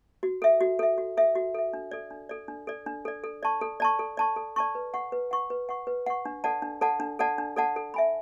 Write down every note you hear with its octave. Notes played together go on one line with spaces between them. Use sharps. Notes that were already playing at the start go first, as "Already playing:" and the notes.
F#4
A4 E5
F#4
A4 E5
F#4
A4 E5
F#4
A4 E5
D4
A4 D5
D4
A4 D5
D4
A4 D5
D4
A4 D5
A4
D5 A5 C#6
A4
D5 A5 C#6
A4
D5 A5 C#6
A4
D5 A5 C#6
B4
F#5 C#6
B4
F#5 C#6
B4
F#5 C#6
B4
F#5 C#6
D4
A4 D5 F#5 A5
D4
A4 D5 F#5 A5
D4
A4 D5 F#5 A5
D4
A4 D5 F#5 A5
A4
E5 G#5 B5